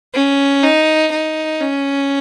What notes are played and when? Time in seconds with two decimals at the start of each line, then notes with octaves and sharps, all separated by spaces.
0.14 C#4
0.63 D#4
1.11 D#4
1.61 C#4